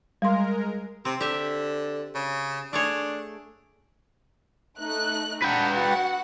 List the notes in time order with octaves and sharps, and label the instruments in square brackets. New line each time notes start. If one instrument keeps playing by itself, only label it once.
[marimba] G3 C6 [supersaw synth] G#3 A#4
[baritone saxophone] C3 [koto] C4
[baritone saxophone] D3 [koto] G4 E5
[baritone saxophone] C#3
[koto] A3 G#4 C#5 [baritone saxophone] D4
[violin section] A3 D#4 F#6
[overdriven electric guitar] B4 G5 [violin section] F#5 A5 A#5
[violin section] F#4 F#5